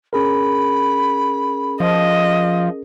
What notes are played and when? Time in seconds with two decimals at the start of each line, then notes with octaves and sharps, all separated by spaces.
0.13 C#4 G#4 A#4 B5
1.80 F3 D#5